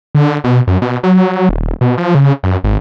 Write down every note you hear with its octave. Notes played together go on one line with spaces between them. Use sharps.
D3
B2
F#2
B2
F#3
D#1
B2
F3
C#3
F#2
G#1